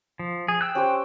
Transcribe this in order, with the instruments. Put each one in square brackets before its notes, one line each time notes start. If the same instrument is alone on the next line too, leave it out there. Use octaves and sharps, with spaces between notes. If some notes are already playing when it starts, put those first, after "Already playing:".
[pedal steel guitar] F3
G#4
G5 E6 F#6
[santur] C#4 G4 C5